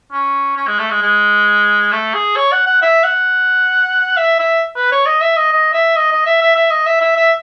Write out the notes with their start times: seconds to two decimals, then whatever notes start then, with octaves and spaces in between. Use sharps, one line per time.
0.12 C#4
0.57 C#4
0.68 G#3
0.79 A3
0.91 G#3
1.02 G#3
1.92 A3
2.14 G#4
2.36 C#5
2.52 F#5
2.66 F#5
2.82 E5
3.04 F#5
4.17 E5
4.39 E5
4.76 B4
4.92 C#5
5.06 D#5
5.21 E5
5.37 D#5
5.52 D#5
5.74 E5
5.96 D#5
6.12 D#5
6.26 E5
6.42 E5
6.56 E5
6.71 D#5
6.86 E5
7.01 E5
7.16 E5